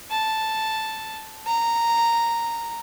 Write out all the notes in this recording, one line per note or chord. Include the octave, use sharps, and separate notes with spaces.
A5
A#5